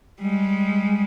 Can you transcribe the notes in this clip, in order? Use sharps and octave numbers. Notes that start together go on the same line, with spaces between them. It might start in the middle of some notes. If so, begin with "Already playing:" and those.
G3 G#3